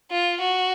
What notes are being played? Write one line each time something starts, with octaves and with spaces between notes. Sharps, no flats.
F4
F#4